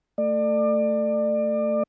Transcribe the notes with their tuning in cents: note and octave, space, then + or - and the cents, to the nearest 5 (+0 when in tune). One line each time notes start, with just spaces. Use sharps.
A3 +15 D5 +30